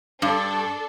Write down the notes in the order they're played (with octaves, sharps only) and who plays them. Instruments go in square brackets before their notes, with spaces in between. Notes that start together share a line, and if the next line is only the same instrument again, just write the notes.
[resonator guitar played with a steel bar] G2 [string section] D4 A4